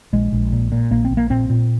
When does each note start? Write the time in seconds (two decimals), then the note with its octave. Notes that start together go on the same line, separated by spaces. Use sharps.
0.13 A#1 G#3
0.33 A#1
0.52 A#2
0.72 A#2
0.91 A#1 A#3
1.05 C4
1.11 A#1
1.17 A#3
1.30 A#2 C4
1.50 A#2